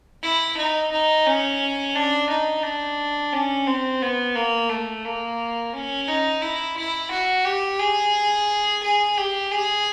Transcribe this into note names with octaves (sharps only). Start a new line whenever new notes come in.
E4
D#4
D#4
C#4
D4
D#4
D4
C#4
C4
B3
A#3
A3
A#3
C#4
D#4
E4
E4
F#4
G4
G#4
G#4
G4
G#4